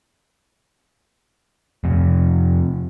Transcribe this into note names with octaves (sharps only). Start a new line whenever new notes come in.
F2 C3